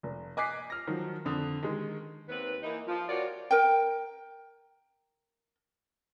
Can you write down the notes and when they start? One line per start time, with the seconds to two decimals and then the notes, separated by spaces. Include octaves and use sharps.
0.03 F1
0.37 D#5 G#5 D6 F#6 B6 C7
0.70 F6 A#6
0.87 D#3 F3 F#3
1.25 F2 D3 D#6
1.63 D#3 G#3
2.29 D#2 C4 B4
2.63 E3 A#3 D#4
2.87 F3
3.08 C3 F4 F#4 A#4 C#5 D5
3.51 A#4 G5